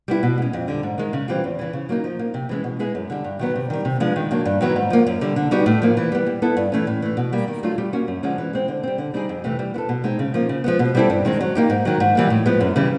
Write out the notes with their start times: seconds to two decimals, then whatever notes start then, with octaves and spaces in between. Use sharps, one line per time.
0.08 G3 B3 E4
0.23 B2
0.38 G#3 C#4
0.53 F2
0.68 D3 G3
0.83 G#2
0.98 D#3 G#3
1.13 C#3
1.28 E3 G3 C4 F4
1.44 E2
1.59 C#3 E3
1.73 C#3
1.89 F#3 A#3 D#4
2.04 F3
2.19 A#3 D#4
2.34 C3
2.49 E3 G#3 C#4
2.64 B2
2.79 G#3 B3 E4 G#4
2.95 F#2
3.10 D3 G3
3.24 G2
3.39 D#3 F#3 B3
3.56 C3
3.70 D#3 G3
3.85 C3
4.00 F3 G#3 B3 D4
4.16 D#3
4.31 F#3 A#3 D4
4.45 G2
4.61 D#3 F#3 B3 E4
4.76 G#2
4.90 F3 A#3
5.07 F#2
5.21 D3 G3
5.36 D3
5.51 G3 B3 D#4 F#4
5.66 A2
5.82 F3 A#3
5.97 E3
6.12 G3 B3
6.26 G3
6.42 B3 E4 A4
6.57 G2
6.72 E3 A3 C#4
6.87 A2
7.02 E3 A3
7.17 B2
7.33 G3 A#3
7.48 D#3
7.63 F#3 A3 D4 F4
7.78 G3
7.93 A#3 C#4 F#4
8.08 F#2
8.23 D3 F3 G#3 C#4
8.38 E3
8.53 G#3 C4
8.68 D3
8.83 G3 C4
8.98 D3
9.14 G3 C4 D#4 G#4
9.29 F2
9.44 C3 E3 A3
9.59 G3
9.74 B3 E4 A4
9.89 B2
10.04 G#3 C4 D#4
10.19 C#3
10.34 F3 A#3 D#4
10.49 C#3
10.64 F3 G#3 B3
10.79 B2
10.95 G3 C4 E4 A4
11.10 G2
11.25 D#3 G#3 C4
11.41 F#3
11.55 A#3 D#4 G4
11.70 G#2
11.85 D#3 F#3
12.00 G#2
12.15 E3 G3 A#3
12.30 A2
12.46 F3 G#3 B3
12.61 F#2
12.76 C#3 E3 G3